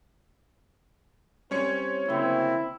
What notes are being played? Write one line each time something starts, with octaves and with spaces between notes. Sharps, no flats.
G3 C4 C#4 C5 C#5 C#7
D2 C#3 A#3 C4 E4